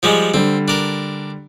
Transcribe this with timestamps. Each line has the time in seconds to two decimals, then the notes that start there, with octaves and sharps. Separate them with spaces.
0.03 F3 G3 G#3
0.34 D3 G3 C4
0.68 D4 A#4